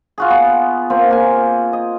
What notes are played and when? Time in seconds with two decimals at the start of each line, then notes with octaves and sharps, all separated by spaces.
0.18 F4 F#4 G#4
0.30 B3
0.90 A#3 C4 F4
1.11 A#3 G#5
1.73 D#5